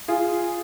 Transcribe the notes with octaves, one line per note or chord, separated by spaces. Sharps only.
F4 G#4